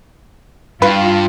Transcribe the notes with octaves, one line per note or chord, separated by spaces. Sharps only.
G2 F4 B4